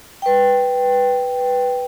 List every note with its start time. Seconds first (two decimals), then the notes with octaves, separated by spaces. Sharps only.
0.22 B4 G5